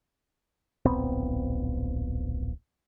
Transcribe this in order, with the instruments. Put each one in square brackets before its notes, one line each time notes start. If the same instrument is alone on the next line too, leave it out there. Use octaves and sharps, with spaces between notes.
[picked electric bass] D1 A#1 B3 C4